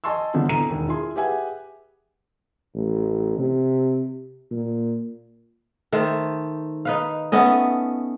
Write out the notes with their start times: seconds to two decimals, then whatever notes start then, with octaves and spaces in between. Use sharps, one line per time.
0.04 D#5 G#5 A5 C6 C#6 E6
0.34 G1 D3 B3 F4
0.49 D2 A2 B3 A#5 D#7
0.70 E1 D#2
0.88 E4 F4 G#4 C6
1.16 G4 G#4 B4 E5 F#5 G#5
2.75 A1
3.38 C3
4.51 A#2
5.92 D#3 A3 C5
6.85 D#4 B4 F5
7.32 A3 B3 C#4 D#5